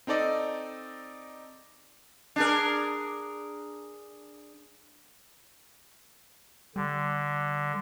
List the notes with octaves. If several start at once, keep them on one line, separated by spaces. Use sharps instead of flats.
C4 D#4 A4 D5 D#5
D4 G#4 A#4
D3 G3